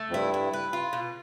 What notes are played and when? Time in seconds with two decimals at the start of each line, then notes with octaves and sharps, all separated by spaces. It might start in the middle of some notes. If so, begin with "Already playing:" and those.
Already playing: A3
0.10 F2
0.14 G2 E4
0.34 E4
0.53 B4
0.73 F4
0.93 B2